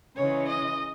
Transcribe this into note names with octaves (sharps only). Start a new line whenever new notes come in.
C#3 E3 G#3 C#5
D#5